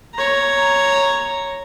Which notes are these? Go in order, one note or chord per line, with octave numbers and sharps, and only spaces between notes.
C#5 A#5